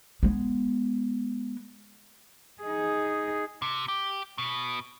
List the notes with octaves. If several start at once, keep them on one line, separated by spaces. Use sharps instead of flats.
G#3 B3
D#4 G#4
C3
G4
B2